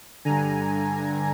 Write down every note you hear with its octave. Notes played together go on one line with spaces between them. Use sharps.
G2 D3 G#5 A#5